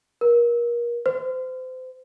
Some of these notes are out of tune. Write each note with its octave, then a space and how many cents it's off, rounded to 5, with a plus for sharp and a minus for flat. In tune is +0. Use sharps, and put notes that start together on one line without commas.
A#4 +30
C5 -30